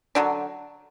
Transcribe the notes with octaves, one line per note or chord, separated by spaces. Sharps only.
D3 F#3 D4